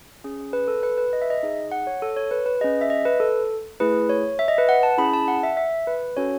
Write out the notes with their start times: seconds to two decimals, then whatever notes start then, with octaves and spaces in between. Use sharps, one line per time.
0.24 C#4 G#4
0.53 B4
0.68 A4
0.83 B4
0.98 B4
1.13 D#5
1.22 E5
1.30 D#5
1.43 D#4 G#4
1.71 F#5
1.87 C#5
2.02 A4
2.17 C#5
2.31 B4
2.46 B4
2.61 G#4 D#5
2.64 C#4
2.81 E5
2.90 D#5
3.05 B4
3.20 A4
3.80 A3 E4 G#4 B4
4.09 C#5
4.39 E5
4.48 D#5
4.58 B4
4.69 F#5
4.83 A5
4.98 C#4 E4 G#4 B5
5.13 A5
5.28 F#5
5.43 E5
5.57 E5
5.87 B4
6.17 C#4 F#4 A4 C#5